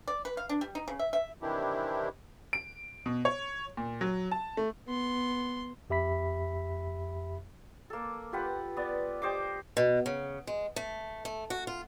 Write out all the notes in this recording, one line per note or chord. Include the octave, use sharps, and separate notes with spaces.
D5
B4
F5
D4
G3
D#4
C#3
E5
E5
C3 D#3 E3 D4 E4 G4
D7
B2
C#5
A#2
F#3
A5
A3
B3 C6
F2 G4 E5 B5 B6
A#3 A4
F4 G4 B4 F#5
B3 D5
G4 C5 D#5 D6
B2
C#3
G#3
A3
A3
F#4
F4